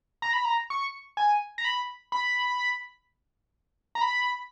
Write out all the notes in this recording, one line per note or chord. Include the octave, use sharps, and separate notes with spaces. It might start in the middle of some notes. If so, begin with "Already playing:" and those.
A#5
B5
A#5
C#6
G#5
A#5
B5
B5
A#5
B5